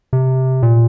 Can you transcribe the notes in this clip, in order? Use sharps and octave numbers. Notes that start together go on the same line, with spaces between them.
C3
A#2